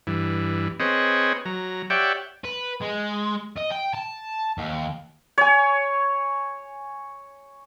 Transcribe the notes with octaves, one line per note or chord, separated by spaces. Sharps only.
G2 E3
C4 G#4 B4 C#5 D#5
F#3 A#5
G4 C#5 D5 E5 F#5 G5
B4
G#3
D#5
G5
A5
D#2
C#5 G#5